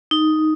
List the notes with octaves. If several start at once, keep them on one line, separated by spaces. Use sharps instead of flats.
D#4